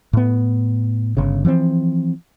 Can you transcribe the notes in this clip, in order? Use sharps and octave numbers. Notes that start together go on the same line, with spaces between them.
A2 B3
G1 C#3
E3 F3 A#3 C4